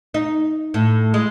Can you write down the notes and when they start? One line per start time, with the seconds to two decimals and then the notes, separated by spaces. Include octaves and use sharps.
0.14 D#4
0.74 A2
1.14 G#3